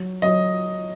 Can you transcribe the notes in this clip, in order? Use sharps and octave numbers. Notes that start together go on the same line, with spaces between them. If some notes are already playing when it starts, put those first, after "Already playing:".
Already playing: F#3
F#3 D#5